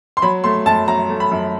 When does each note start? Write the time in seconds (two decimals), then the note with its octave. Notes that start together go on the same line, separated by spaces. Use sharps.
0.17 C6
0.22 F#3 B5
0.44 A3 C6
0.66 F#2 A5
0.87 F#3 A#5
1.09 A3
1.20 B5
1.31 F#2